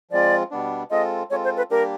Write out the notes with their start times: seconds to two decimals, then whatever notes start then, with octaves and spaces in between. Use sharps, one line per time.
0.11 F3 G#3 C4 F4 D5
0.51 B2 G3 B3 D4
0.91 G#3 C4 F4 A4 D#5
1.30 G#3 C4 F4 A4 C#5
1.44 C5
1.57 B4
1.70 G3 A#3 D4 G4 A#4